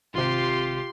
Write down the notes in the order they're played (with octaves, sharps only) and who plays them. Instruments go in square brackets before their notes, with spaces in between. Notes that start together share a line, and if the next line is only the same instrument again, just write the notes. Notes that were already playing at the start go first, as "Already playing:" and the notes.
[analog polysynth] G#1 C3 [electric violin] F4 G4 [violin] C6